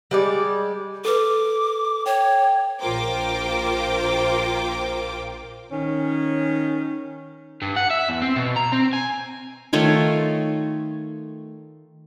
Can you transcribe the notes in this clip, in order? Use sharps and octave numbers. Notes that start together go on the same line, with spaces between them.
G3 G#3 D5
A4 B4 D6
C#5 G5
A#1 F4 A#4 C5 G5 D6
D#3 C#4
G2
F#5
E5
E2
C4
B2
A#5
C4
G#5
D#3 A3 F4 C#5